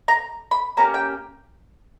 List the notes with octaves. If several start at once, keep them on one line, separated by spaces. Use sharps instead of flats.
A#5
B5
A#3 C#4 G4 A#5
G5